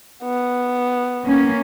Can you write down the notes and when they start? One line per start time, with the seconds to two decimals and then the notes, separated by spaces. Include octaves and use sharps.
0.24 B3
1.25 A#3 C#4